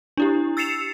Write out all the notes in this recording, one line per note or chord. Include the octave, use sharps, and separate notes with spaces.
D4 E4 G4
E6 A6 C7 C#7 E7 F7